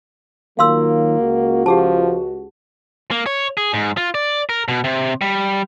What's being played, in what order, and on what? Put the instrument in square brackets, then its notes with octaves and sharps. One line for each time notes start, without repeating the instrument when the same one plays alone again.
[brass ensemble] D#3 F#3 F4 [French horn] A#3 [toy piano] F5 C6 E6
[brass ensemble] C#2 F#4
[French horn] F3 [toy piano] G4 G#4 A5
[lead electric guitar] A#3
C#5
G#4
G#2
F4
D5
A#4
B2
C3
G3